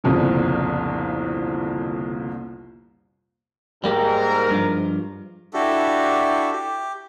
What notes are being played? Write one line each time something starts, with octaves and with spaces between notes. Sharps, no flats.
G1 C2 F2 A#2 C#3
G#2 G3 A#3 G4 A#4
G2 F3
D4 E4 F#4 G4 A4
G4